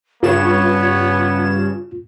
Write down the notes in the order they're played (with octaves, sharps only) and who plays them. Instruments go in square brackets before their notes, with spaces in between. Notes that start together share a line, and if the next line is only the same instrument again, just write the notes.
[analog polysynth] G2 C#3 E7 [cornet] B3 [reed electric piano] F4 [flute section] C#5